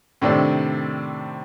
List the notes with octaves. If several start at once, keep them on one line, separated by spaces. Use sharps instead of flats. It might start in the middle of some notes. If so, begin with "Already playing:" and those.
A2 C3 D#3 C4 D4